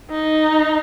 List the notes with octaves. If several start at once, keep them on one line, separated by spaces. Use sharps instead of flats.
D#4